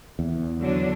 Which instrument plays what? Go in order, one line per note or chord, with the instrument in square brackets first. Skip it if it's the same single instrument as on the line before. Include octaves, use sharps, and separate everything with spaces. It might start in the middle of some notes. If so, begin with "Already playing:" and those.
[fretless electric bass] E2
[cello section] D3 F#3 D4